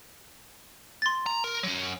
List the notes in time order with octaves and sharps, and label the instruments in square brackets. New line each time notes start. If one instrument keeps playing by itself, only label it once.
[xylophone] C6 A6
[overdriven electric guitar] A#5
A#4
F#3 C#4